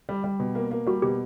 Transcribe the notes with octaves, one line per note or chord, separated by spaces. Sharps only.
G3
G3
B2
A#3
A#3
G3 F#4
B2 G4